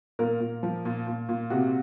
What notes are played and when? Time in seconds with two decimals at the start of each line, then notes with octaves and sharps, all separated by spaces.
0.19 A#2 A#4
0.40 A#2
0.63 F3
0.85 A#2
1.07 A#2
1.29 A#2
1.50 C3 F#4